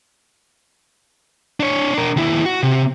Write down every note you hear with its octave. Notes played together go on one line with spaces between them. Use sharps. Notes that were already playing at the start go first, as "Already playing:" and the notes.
D4 C#5
D4 A#4
D#2 E4
F#4
C3